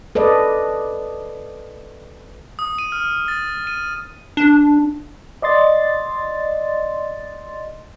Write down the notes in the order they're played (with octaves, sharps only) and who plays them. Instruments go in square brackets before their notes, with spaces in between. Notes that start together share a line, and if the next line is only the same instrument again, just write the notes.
[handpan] A4 B4 D5 D#5
[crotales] D#6
D#7
F6
A6
D#7
[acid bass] D4
[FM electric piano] D5 D#5 C6 A6